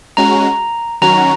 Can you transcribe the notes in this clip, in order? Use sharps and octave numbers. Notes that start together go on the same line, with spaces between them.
G#3 C#4 F#4 A#5
D#3 F#3 C#4 F#4 A#5